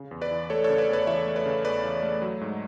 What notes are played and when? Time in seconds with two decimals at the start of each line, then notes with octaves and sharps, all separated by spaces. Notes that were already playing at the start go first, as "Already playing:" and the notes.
Already playing: C#3
0.11 E2
0.21 B4 D5
0.31 E3
0.50 A3 A4 C#5
0.64 A4 C#5
0.70 C#3
0.78 B4 D5
0.88 E2
0.93 B4 D5
1.07 E3 C#5 E5
1.26 A3
1.36 B4 D5
1.45 C#3
1.65 E2 B4 D5
1.83 E3
2.03 A3
2.22 F#3
2.41 G#2